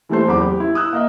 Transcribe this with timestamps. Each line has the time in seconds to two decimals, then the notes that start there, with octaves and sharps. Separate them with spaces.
0.09 E3 G3 A3 A4 C5
0.27 F#1 E2 B5 D6
0.41 G4
0.60 E4
0.75 D#6 E6 F#6
0.93 A#3 D#5 E5